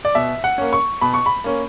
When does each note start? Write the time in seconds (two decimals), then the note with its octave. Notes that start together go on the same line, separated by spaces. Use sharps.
0.05 D5
0.15 B2 E5
0.44 F#5
0.58 A#3 C#4
0.73 C#6
1.01 B2 B5
1.14 C#6
1.26 B5
1.44 A#3 C#4